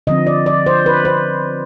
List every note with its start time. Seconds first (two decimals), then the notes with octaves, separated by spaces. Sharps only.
0.07 D3 F3 C4 D#5
0.27 D5
0.46 D5
0.66 C5
0.86 B4
1.05 C5